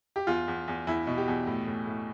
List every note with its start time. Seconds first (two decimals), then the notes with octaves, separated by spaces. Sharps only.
0.16 G4
0.27 E2 F4
0.48 E2
0.68 E2
0.87 E2 E4
1.07 B2
1.18 G4
1.28 E2
1.47 A2
1.67 A2
1.87 A2